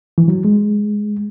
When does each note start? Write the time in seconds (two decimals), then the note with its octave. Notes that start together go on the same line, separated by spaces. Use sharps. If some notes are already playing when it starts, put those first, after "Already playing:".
0.18 E3
0.28 F#3
0.45 G#3